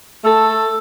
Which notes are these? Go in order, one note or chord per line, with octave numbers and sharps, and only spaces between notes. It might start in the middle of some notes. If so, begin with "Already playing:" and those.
A3 A4